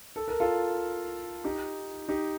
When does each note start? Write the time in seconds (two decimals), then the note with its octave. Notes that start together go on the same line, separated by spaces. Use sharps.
0.16 A4
0.28 A#4
0.40 F4 A4
1.44 D#4 G4
2.08 D#4 G4